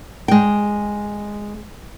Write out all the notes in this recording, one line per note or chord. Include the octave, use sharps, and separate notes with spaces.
G#3 G5